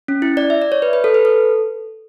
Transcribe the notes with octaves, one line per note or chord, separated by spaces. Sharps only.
C#4
E4
D5
E5
D5
C#5
B4
B4
A4
B4
A4